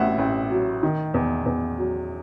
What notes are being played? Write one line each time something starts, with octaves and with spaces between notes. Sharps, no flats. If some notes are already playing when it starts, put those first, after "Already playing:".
Already playing: A1 A2 E5 F#5
A1
F#3
D#3
E2
E2
F#3